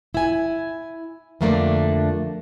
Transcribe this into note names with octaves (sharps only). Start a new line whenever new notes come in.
E4 G#5
F2 D3 A3 A#3 C#4 D4